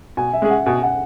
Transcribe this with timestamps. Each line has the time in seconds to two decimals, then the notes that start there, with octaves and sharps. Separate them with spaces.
0.17 B2 G#5
0.33 E5
0.42 G#3 C#4 G#4
0.50 F#5
0.66 B2 G#5
0.83 F#5